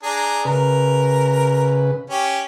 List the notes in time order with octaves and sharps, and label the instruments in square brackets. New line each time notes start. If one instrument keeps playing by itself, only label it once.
[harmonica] D4 G#4 A#5
[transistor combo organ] C#3 B4 [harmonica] A#4
[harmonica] C#4 G4